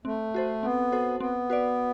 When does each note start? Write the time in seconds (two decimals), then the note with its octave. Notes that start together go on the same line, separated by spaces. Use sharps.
0.05 A3 C4
0.34 F#4 A4 C5
0.63 B3 C4
0.92 F#4 A4 C5
1.20 B3 C4
1.50 F#4 B4 D5